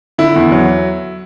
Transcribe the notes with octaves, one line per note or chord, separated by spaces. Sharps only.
D3 E4
E2
F#3